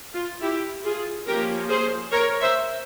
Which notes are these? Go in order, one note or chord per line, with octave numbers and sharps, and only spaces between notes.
F4
E4 G4
F4 G#4
F3 A#3 C#4 G4 A#4
G#4 C5
A#4 C#5
C5 E5